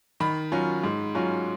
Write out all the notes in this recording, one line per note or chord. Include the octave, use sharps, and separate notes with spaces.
D#3 B5
F#3 C#4 F4
G#2
F#3 C#4 F4